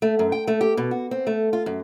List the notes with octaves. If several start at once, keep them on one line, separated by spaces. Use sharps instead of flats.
A3
F#2
G5
A3
G4
B2
F#4
C4
A3
F4
F#2